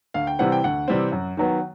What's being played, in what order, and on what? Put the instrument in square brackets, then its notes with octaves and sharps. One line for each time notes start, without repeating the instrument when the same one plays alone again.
[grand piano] D2 F5
G5
C3 E3 G3 C4 F#5
G5
D2 F#5
C3 E3 G3 C4
F#2
D#3 F#3 B3